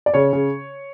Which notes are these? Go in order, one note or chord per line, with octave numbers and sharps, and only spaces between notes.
D5
C#3 C#5
C#3